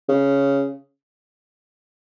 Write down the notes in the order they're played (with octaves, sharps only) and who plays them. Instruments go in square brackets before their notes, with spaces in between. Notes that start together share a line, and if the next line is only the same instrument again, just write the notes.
[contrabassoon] C#3